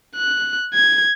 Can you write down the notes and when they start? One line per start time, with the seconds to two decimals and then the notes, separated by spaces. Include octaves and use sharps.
0.16 F#6
0.74 G#6